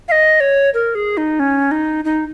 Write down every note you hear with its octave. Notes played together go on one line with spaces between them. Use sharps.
F5
D#5
C#5
A#4
G#4
D#4
C#4
D#4
D#4